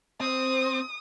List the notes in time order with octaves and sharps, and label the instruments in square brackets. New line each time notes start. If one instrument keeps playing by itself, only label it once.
[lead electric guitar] C4 [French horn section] C5 [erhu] D#6